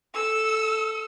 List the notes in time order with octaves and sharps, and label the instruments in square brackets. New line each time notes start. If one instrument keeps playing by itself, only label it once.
[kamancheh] A4 E6